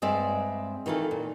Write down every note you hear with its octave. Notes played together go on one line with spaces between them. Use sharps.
G2 G#3 C4 D5 E5
D#3 E3 A3 F4 A4
A#2